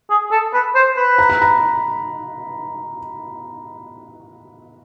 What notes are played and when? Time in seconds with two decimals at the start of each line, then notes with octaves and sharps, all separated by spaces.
0.10 G#4
0.31 A4
0.54 B4
0.75 C5
0.97 B4
1.19 A#5
1.30 B5
1.42 A#5